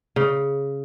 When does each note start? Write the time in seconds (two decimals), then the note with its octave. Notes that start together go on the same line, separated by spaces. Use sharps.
0.16 C#3